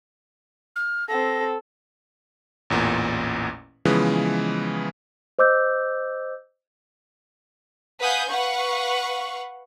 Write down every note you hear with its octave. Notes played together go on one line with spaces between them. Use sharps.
F6
C4 A4 A#6
A1 E2 A#2
C#3 E3 F3 G#3 B3
C5 D#5 D6 E6 G6
B4 F5 F#5 G#5 D#6 G6
B4 F5 F#5 C#6